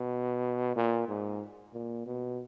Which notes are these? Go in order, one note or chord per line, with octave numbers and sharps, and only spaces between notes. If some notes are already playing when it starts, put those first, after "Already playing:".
Already playing: B2
A#2
G#2
A#2
B2